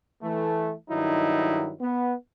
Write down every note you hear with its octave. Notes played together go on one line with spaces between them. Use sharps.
E3 A3
G2 D#3 F#3 D#4 E4
B3